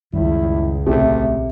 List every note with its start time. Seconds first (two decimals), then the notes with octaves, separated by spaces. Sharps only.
0.13 C#2 F#2 D#3 G3 E4
0.86 A#1 C3 F3 A3 C#4